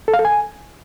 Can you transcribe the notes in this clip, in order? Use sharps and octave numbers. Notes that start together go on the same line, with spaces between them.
A4
F5
A4
G#5